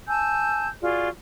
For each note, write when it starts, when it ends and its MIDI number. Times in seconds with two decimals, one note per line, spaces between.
0.08 0.68 80
0.08 0.68 81
0.08 0.68 88
0.08 0.68 91
0.82 1.09 65
0.82 1.09 66
0.82 1.09 68
0.82 1.09 74